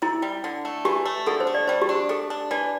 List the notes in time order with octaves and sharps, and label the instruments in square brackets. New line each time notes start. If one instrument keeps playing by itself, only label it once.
[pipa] C3 [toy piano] E4
[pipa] G3
D3
A3
[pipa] E3 [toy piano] G4
[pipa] A3
[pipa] D3 [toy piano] A4
[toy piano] C5
[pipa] A3
[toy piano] D5
[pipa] G3 [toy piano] C5
[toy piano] G4
[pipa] D4
[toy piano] G4
[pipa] A3 [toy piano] A4
[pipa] D4
[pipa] E3 [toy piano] D5